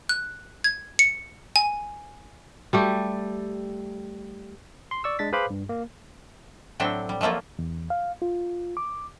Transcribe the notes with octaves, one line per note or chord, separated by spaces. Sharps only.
F#6
G#6
C#7
G#5
G3 A3 G4
C6
D5 C#6 E6
G#3 D4 A6 B6
G#4 B4 C5 F5 B5 D6
G2
A#3
A2 F#3 C4 D4 E5 G5
G3
F3 F#3 A3 A#3 F4
E2
F5
F4
D6